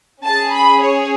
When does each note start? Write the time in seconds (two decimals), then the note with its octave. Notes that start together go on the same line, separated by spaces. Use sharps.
0.23 C#4 G#4 A5
0.52 B5
0.81 C#5